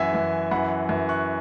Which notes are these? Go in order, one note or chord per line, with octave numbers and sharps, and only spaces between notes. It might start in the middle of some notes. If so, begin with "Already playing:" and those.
Already playing: F#2 E3 E5 F#5 G#5
F#2 E3
F#2 E3 F#5 B5
F#2 E3
C#6 F#6